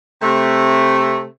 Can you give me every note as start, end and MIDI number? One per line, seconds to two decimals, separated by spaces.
0.21 1.24 48
0.21 1.24 57